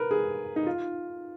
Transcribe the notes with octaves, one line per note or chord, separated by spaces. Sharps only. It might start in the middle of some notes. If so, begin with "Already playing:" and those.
Already playing: A#4 B4
G#4
D#4
F4